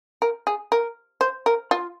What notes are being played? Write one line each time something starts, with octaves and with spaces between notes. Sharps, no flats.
A#4
G#4
A#4
C5
A#4
F4